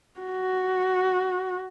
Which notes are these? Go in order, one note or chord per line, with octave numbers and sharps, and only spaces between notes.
F#4